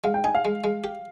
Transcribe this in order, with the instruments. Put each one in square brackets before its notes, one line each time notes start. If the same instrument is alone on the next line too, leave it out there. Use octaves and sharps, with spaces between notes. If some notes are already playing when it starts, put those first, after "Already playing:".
[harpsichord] G#3 [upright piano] F5
[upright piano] G5
[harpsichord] D#4 [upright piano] G#5
[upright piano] F5
[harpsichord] G#3
G#3
G4